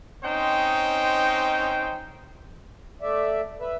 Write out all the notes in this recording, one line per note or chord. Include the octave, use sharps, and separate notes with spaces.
C4 C#4 D#4 C5 D#5 G5
A3 D5 E5
B4 E5